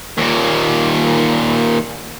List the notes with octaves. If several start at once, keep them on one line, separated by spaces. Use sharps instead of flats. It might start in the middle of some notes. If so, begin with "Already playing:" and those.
D#2 A#2